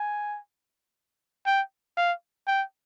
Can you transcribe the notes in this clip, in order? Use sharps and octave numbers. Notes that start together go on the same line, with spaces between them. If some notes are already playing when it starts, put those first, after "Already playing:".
Already playing: G#5
G5
F5
G5